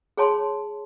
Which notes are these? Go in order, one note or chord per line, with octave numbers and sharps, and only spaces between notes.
G#4 C#5 A5 C6